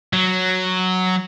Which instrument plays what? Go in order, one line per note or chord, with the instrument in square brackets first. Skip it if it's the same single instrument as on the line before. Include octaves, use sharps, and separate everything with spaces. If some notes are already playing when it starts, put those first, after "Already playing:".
[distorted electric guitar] F#3